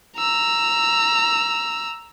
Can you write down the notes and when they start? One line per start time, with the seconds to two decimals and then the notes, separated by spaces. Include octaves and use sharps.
0.17 A#5 E6